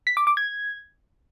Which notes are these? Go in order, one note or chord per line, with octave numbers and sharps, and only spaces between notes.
B6
D6
D6
G#6